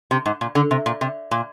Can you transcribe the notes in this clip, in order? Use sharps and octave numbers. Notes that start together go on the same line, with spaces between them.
C3
G#2
A#2
D3
C3
A#2
C3
A#2